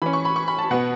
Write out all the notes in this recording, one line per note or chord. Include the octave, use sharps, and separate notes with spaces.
E3 C#4 B5
C#6
B5
C#6
B5
A5
B2 B3 F#5